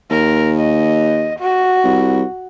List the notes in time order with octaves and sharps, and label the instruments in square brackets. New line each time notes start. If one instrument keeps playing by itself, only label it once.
[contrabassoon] D#2 [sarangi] A#4
[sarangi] D#5
F#4
[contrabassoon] C2